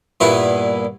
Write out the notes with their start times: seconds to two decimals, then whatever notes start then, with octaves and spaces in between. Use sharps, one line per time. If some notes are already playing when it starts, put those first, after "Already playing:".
0.20 G2 A#2 B3 E4